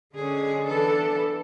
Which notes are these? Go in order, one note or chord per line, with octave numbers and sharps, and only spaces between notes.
D3 G#3 C#4 G#4
E3 B3 D4 A4